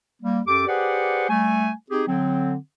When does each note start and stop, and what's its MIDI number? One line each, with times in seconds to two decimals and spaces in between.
0.22 0.40 55
0.22 0.40 58
0.47 0.63 42
0.47 0.63 67
0.47 0.63 69
0.47 0.63 86
0.68 1.26 67
0.68 1.26 68
0.68 1.26 71
0.68 1.26 72
0.68 1.26 74
0.68 1.26 78
1.29 1.71 55
1.29 1.71 57
1.29 1.71 80
1.91 2.03 60
1.91 2.03 63
1.91 2.03 67
1.91 2.03 68
2.07 2.55 50
2.07 2.55 54
2.07 2.55 60